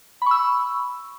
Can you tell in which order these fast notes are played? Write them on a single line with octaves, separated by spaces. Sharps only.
B5 C#6 E6